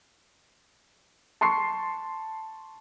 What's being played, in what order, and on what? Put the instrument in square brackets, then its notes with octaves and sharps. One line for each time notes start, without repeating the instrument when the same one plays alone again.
[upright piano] A5 C6 C#6 C7